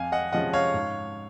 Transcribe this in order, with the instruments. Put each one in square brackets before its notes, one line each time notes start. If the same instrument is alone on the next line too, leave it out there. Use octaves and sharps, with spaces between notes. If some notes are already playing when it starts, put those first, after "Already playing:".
Already playing: [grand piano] F2 F5 G#5
D#5 F#5
C3 F3 G#3 C#4 D#5 F#5
C#5 F5
G#2